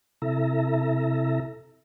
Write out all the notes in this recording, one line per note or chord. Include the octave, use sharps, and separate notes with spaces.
C3 E4 A4 E5 A#5